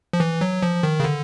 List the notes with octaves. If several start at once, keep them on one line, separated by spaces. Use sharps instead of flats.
F3
E3
F#3
F3
D#3
C#3
D3